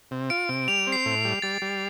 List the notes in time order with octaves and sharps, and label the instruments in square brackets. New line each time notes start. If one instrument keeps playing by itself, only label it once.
[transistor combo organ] C3
[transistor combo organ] F4 [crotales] D7
[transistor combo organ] C3
[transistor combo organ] G3 [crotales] F7
[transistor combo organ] C4
[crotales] C7
[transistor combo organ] A2
G3
[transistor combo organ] G3 [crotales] A6
[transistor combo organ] G3